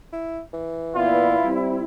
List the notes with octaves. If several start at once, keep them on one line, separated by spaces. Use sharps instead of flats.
E4
E3
A#2 B3 E4 F4 D5
G3 C4